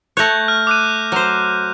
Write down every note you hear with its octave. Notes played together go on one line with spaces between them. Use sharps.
A3 C#5 F#6 G6 A#6
F6
D6 F#6 D#7
F#3 C5